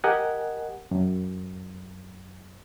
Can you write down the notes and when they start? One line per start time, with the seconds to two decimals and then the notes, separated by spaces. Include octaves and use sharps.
0.04 G4 A#4 D#5 F#5 G#5
0.91 F#2